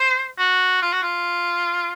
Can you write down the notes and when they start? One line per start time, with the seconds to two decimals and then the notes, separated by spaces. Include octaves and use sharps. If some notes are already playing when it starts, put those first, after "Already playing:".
Already playing: C5
0.38 F#4
0.82 F4
0.92 F#4
1.03 F4